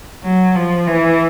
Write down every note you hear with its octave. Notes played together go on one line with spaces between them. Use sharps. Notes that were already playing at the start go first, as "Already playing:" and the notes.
F#3
F3
E3